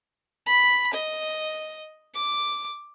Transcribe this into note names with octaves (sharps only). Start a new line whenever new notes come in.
B5
D#5
D6